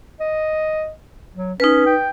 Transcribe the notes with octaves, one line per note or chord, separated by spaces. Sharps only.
D#5
F#3
C#4 D#4 B4
G5